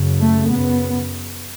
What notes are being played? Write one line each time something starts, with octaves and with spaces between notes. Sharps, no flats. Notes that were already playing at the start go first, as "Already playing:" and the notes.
Already playing: F#2 C#3
A3
F#2 C#3 B3